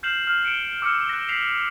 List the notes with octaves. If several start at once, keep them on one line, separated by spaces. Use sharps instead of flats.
F6 G6 C7 E7 F#7
F6
C#7 D7 E7 G7
D6 E6 F6 C#7
F#6 A#6
B6 C7 F7 F#7